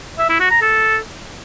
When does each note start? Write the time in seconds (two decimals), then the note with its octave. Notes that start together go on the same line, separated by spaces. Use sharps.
0.19 E5
0.29 E4
0.40 F#4
0.51 A#5
0.62 A4